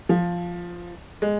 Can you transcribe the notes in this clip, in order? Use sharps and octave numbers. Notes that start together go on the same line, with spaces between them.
F3
G#3